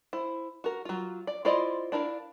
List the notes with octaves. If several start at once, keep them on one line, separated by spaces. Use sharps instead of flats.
E4 C5
F#4 A#4
F#3 F4
D5
E4 F4 C5 D5 D#5
D4 E4 A#4 F5